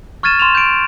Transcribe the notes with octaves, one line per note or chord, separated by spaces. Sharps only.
C#6 F6 G#6 A6 D#7 E7
C6 E7 F7
G6 D7